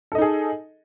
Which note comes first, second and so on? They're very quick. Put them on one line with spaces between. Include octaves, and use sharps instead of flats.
A4 D#5 D#4 G#4